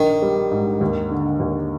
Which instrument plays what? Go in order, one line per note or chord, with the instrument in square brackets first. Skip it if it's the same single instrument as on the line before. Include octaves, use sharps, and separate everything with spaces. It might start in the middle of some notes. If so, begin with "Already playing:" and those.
Already playing: [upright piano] A#1 [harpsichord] D#3
[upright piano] G3
G#2
D#2
D3
D#2